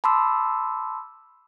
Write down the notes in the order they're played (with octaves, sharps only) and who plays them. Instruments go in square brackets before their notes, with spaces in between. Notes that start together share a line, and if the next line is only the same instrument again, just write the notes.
[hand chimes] A5 B5 C6 D6 E6